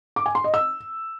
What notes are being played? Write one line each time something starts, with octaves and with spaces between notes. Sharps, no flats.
D6
G#5
C6
D#5
E6